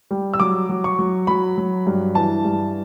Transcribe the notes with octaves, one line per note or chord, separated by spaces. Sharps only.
G3
E6
F#3 D6
F#3
C#6
F#3
F#3 B5
F#3
G2
E3 A5
G2